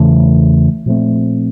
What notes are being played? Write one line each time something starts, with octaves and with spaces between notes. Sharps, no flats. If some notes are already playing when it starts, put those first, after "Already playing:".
Already playing: E2 C#3 E3 A3
A#2 F3 A3 C4